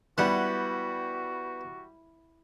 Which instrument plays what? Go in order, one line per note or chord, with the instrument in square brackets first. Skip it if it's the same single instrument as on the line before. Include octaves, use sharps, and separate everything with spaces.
[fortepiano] G3 F#6 [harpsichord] B3 [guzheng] E4 F#5 [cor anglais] F#4